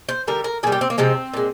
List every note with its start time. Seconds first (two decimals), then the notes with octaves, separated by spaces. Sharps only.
0.09 C5
0.27 D3 G3 A#4
0.44 A#4
0.63 A#2 G#4
0.67 G3
0.72 G4
0.81 C4
0.90 A#3
0.98 C3 F3 G#3 C4
1.34 A#2 G#3